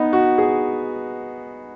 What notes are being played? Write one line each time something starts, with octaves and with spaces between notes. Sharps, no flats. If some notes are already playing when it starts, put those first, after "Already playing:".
Already playing: B3 D#4
F#4
G#4